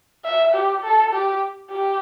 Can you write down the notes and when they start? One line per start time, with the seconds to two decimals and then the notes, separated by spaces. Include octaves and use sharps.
0.24 E5
0.54 G4
0.83 A4
1.12 G4
1.70 G4